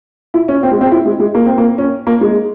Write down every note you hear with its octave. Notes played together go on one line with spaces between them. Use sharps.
E4
C#4
C4
G#3
C4
E4
G#3
G#3
A#3
C4
A#3
C#4
A#3
G#3